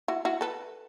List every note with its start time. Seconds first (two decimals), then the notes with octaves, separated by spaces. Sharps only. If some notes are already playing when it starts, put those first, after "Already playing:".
0.08 E4 F#4
0.25 E4 F#4
0.41 A4 B4